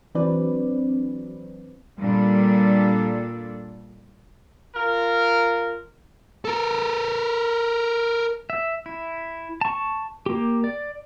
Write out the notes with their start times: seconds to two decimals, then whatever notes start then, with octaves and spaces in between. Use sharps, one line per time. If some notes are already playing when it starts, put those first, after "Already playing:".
0.15 E3 F#3 C4 D4 B4 D5
1.99 A#2 G3 D4 A4
4.74 F4 A#4
6.45 A4 A#4
8.50 E5
8.86 E4
9.61 A5 C#6
10.26 A#3 G4
10.64 D5